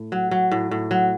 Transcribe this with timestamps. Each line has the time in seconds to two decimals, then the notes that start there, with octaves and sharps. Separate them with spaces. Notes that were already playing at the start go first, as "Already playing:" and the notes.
Already playing: A2
0.12 F#3
0.31 F#3
0.52 A2
0.71 A2
0.91 F#3